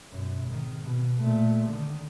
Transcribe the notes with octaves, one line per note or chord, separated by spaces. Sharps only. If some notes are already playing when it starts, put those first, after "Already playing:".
F#2 B2
G#1 D#3
B2
A#2 A3
D3 D#3